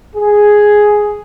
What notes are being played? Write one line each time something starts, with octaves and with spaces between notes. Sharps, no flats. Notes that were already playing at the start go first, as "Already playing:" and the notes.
G#4